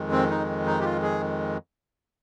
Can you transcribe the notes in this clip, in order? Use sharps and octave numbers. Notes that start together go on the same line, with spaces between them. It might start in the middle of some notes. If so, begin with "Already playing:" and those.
Already playing: F2 D#3 G#3
C4
D#4
D#4
G4
F4
G#4